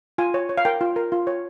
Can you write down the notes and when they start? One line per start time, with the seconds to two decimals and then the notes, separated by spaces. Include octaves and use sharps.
0.18 F4 G#5
0.34 C#5
0.49 C#5
0.57 F5
0.65 A#4 G5
0.81 F4
0.96 A#4
1.12 F4
1.27 C#5